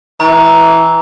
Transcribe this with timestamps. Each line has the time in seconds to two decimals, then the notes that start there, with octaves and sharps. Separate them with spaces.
0.20 E3 A#5